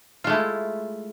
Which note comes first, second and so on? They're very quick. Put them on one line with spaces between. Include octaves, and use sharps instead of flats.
F4 G#3 A3 E4